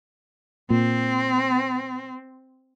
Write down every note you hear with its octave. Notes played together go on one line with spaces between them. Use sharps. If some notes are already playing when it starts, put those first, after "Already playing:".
A#2 C4